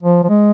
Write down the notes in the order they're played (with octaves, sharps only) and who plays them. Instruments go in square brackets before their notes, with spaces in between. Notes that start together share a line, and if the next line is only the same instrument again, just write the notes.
[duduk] F3
F3
G#3